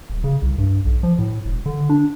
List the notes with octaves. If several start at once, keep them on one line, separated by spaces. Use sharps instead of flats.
D#1
C#3
C2
G2
B1
F3
A2
E1
D3
D4